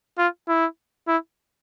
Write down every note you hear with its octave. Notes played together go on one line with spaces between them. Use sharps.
F4
E4
E4